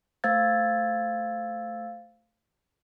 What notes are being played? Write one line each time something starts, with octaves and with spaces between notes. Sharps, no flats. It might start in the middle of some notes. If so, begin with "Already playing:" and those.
A3 C5 F5 E6 G#6 A6